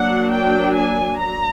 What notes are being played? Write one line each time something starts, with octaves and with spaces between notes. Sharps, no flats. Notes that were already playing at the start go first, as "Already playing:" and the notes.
Already playing: F#3 A#3 D4 F#5
G5
G#5
A#5